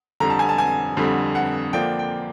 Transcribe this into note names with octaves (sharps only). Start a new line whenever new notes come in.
F2 D3 G3 A#5
A5
G#5
A5
G#5
F2 D3 G3
F#5
D3 F3 A#3 D4 G5
G5